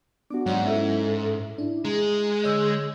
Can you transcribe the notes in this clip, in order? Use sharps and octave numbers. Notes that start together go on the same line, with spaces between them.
B3 D4 F#4 D6
G#2 F#3 C#5 D5 F#5
C#4 E4 A4 E5
D4 E4
G#3 G#4 A#5
D3 C#5 D#5 E6 G6